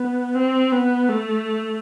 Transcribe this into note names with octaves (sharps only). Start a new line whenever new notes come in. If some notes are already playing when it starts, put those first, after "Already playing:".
Already playing: B3
C4
B3
A3